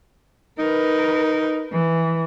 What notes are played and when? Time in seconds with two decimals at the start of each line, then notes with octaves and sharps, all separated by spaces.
0.59 D#4 A#4 B4
1.72 E3